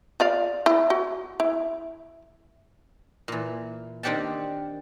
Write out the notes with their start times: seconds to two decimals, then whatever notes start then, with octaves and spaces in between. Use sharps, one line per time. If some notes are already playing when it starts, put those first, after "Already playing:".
0.20 F4 D5 F5
0.66 E4
0.90 F#4
1.40 E4
3.28 A#2 E3
4.03 D#3 C4 D4 G4 F#5 A5